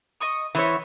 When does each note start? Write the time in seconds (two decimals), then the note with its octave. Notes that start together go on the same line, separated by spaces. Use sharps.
0.20 D#5 C#6 D#6
0.55 E3 B3 C5 C#5 E5